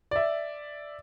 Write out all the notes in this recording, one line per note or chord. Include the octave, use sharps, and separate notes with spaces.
D5 E5